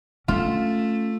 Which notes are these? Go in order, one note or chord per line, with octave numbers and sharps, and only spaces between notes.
A3 C#4 F4